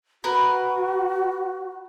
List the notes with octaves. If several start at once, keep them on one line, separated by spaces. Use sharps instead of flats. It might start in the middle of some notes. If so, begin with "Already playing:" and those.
F#4 A#4 B4